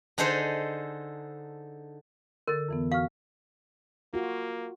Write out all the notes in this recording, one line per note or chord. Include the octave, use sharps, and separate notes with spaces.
D3 D#4 G#4 A4 C5
D3 A4 A#4 A6
F2 E3 B3
F#4 F5 C#6 F6
A#3 F4 F#4